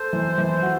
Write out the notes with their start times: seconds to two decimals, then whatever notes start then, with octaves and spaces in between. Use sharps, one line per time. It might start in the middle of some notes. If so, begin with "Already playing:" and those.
Already playing: A4 C5
0.13 E3
0.38 E3
0.62 F#4